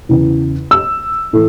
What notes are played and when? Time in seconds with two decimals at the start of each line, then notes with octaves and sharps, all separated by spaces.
0.09 E2 C#3 E3
0.71 E6
1.33 A2 E3 A3